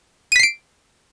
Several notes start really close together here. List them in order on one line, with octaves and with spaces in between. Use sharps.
D#7 B6 C7 D7